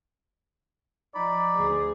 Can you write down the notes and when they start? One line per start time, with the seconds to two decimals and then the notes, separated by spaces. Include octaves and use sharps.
1.15 F3 D#4 D5 B5
1.58 D2 G#4